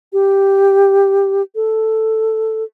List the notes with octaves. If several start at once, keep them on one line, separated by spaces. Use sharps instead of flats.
G4
A4